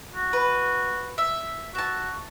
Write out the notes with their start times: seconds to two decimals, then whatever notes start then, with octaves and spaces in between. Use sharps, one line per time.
0.15 F#4
0.33 B4
1.18 E5
1.75 F#4 E5 A5